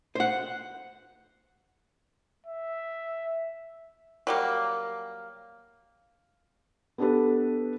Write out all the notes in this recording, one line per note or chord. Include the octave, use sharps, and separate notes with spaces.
C5 F#5
E5
F#3 G3 A#3
B3 D4 G4 A4 B4